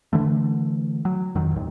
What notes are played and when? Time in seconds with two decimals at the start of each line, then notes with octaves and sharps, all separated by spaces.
0.13 D3 E3 A3
1.05 F#3
1.35 F2 D#3 F#3
1.52 A1 D#2